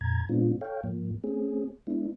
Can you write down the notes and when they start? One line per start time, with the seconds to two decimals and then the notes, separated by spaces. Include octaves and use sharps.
0.01 F2 A#2 A#5 G#6
0.29 A#2 G#3 B3 C4 D4 F4
0.61 A4 C#5 F5 G5
0.83 G#2 F3 A#3
1.24 A3 C4 C#4 G#4
1.87 G#3 B3 D4 E4